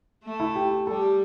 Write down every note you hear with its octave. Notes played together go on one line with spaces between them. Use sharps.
A3
E4
G4
G4
G3 A4